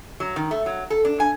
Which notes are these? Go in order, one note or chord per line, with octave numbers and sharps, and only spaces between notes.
F#3
D#3
A3
F#3
A4
D4
G#5